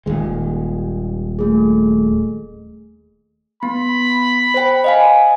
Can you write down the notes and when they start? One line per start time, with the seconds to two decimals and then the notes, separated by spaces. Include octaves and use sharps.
0.06 D#1 D#2 G#3
1.39 A3 G#4
3.63 B3 B5
4.54 C5 G5
4.84 D#5 F5 G#5